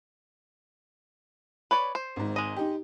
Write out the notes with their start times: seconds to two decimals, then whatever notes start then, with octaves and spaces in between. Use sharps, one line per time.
1.71 B4 C#5 D5
1.95 C5
2.16 G#1 G#2
2.36 G#3 D#5
2.56 D#4 G4